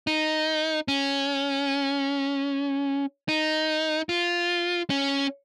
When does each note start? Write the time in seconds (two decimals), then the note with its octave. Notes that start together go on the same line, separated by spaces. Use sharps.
0.07 D#4
0.88 C#4
3.29 D#4
4.09 F4
4.90 C#4